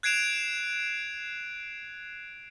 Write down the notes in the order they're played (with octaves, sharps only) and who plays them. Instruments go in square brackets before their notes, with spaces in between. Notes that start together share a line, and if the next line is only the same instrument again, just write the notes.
[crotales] F#6 G#6 C7 D7 E7 F7